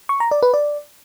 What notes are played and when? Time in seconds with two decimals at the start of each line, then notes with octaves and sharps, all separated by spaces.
0.09 C#6
0.20 A#5
0.31 D5
0.43 B4
0.54 D5